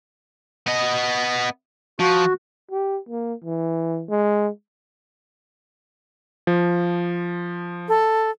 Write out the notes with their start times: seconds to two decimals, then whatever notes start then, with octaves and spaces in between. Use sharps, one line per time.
0.67 B3 D#5
2.00 F3 F#4
2.71 G4
3.09 A#3
3.44 E3
4.09 G#3
6.47 F3
7.88 A4